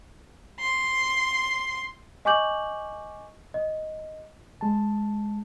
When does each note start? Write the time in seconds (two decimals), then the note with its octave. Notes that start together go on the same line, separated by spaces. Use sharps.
0.60 C6
2.25 D#5 G#5 C#6 D6 G6 F#7
3.54 D#5
4.61 G#3 A5